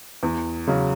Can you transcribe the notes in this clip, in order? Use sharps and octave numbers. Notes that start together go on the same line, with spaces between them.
E2
C#3 F#3